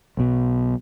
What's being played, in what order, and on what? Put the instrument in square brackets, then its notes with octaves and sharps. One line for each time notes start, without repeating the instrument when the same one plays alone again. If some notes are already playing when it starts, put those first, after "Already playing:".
[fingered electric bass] B1 B2